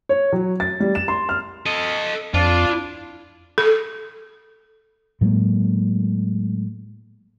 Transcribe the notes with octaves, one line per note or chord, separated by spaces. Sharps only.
C#5
F#3
A6
G3
E7
C6
F6
A4 D#5
F2 D4 F4
A4
A2 F#3 G#3 A#3